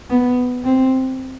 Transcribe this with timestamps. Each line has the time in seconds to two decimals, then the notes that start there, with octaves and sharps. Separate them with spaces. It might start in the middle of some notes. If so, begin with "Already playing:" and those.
0.10 B3
0.64 C4